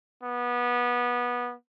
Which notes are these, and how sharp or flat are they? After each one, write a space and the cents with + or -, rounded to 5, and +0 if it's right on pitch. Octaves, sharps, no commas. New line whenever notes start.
B3 -20